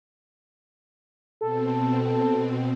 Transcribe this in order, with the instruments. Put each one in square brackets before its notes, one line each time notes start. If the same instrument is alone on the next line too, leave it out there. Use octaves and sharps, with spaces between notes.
[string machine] B2 C4 [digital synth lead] A4